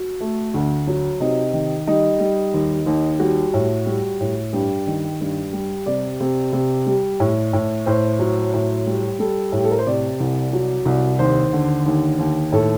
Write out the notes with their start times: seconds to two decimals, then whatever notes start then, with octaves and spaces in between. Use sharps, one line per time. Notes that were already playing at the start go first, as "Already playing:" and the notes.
Already playing: F#4
0.21 A3
0.54 D2
0.87 F#3
1.20 C3 D#4
1.53 D#3
1.87 G3 D#4
2.20 G3
2.54 D#2
2.86 D#2
3.20 G3 F#4
3.54 A2
3.86 G3
4.20 A2
4.53 G2 G4
4.87 D#3
5.21 G2
5.53 G3
5.86 C3 D5
6.20 C3
6.53 C3
6.86 G3
7.20 A2
7.53 A2
7.86 A2 C5
8.19 F#3
8.54 A2
8.87 G3
9.19 G3 A4
9.52 A2
9.57 G4
9.64 A4
9.71 A#4
9.78 C5
9.86 C3 D5
10.20 C2
10.53 F#3
10.86 C2
11.19 D#2 C5
11.53 D3
11.86 D#2
12.19 D#2
12.52 A2 A4